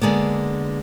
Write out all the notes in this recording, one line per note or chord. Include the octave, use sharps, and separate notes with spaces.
D3 G#3 A#3 B3